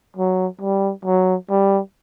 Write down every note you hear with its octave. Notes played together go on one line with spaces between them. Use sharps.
F#3
G3
F#3
G3